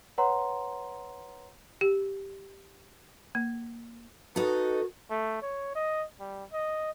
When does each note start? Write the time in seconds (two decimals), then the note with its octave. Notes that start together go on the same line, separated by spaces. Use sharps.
0.18 B4 C#5 F#5 A#5 C6
1.81 G4
3.35 A#3
4.36 D#4 F#4 A4 B4
5.10 A3
5.42 C#5
5.75 D#5
6.20 G3
6.53 D#5